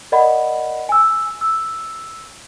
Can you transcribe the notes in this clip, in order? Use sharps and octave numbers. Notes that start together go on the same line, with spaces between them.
A#4 D5 D#5 F#5 B5
G#5 E6
E6